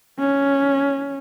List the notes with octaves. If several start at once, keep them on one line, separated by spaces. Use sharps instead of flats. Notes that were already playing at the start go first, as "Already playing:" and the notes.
C#4